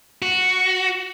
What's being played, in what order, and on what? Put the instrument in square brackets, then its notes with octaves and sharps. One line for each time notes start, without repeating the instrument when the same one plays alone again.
[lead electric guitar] F#4